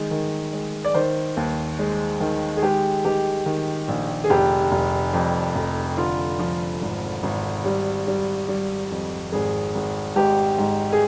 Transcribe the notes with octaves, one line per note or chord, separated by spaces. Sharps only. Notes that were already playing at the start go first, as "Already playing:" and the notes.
Already playing: D#3 G#3
D#3
G#3
D5
D#3 C5
D#2
G#3
D#3
G#4
G#3 G4
D#3 G4
D#3
A#1
G#4
F1 G4
F1
F2
F1
D3 F4
F3
G#1
G#1
G3
G3
G3
F2
G#1 G#4
G#1
G#2 G4
G#2
G#4